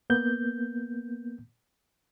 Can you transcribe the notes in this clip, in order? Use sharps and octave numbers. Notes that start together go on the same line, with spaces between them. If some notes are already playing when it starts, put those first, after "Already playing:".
A#3 B3 G6